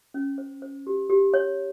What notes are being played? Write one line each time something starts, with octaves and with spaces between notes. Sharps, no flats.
C#4
C5
C5
G4
G4
C#5